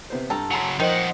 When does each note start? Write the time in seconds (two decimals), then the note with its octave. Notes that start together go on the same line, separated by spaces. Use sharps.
0.10 C3 B3 C5
0.30 G2 A4 G5 A#5
0.51 C#3 F#3 G#5 A#5 C6
0.80 D#3 F3 D#4 C5 D#5 F#5